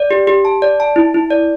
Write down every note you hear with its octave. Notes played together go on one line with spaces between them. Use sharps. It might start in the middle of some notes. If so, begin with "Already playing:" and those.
Already playing: D5
G4
G4
A5
D5
A5
E4
E4
D5